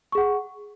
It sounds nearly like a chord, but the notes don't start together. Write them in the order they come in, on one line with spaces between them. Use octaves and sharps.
C#6 G#4 F#5